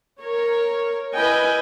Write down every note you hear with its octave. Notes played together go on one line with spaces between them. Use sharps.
A#4 C#5
E4 B4 D#5 G5 G#5